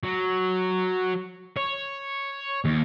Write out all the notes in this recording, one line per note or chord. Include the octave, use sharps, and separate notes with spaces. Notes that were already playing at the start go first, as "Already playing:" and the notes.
F#3
C#5
D#2